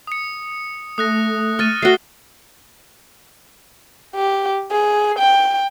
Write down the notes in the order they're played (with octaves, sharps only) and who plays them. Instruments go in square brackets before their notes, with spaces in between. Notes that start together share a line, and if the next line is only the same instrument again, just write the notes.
[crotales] D#6 C#7
[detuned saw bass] A3 [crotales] D#6 F#6 A#6
[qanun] C#6 [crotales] F6 A6 D#7
[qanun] A3 F#4 [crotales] C7 G7
[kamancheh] G4
G#4
G5